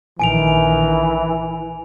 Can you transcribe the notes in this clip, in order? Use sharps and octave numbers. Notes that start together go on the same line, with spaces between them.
A#1 D#3 E3 G#5 D7 F7